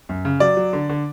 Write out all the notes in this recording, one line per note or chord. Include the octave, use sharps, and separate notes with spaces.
F#2
C#3
F#3 D5
F#3
D3
D3